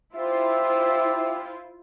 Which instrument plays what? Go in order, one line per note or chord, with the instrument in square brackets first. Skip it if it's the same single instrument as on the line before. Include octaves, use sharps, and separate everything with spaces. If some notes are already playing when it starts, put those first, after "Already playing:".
[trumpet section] D4 G4 E5 [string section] E4 F4 C5